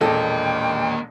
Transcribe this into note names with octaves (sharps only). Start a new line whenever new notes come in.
E1 A#2 A#3 A4 D#5 G5